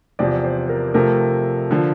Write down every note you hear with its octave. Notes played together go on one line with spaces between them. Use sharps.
E2 C3 F3 D5
C5
A#4
C3 F3 A3 A#4
D3 F3